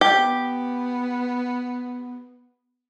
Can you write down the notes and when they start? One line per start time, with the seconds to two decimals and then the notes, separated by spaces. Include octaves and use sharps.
0.01 G4
0.18 B3